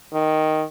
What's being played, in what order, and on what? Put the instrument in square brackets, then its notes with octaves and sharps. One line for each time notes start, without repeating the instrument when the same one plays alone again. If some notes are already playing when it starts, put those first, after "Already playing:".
[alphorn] D#3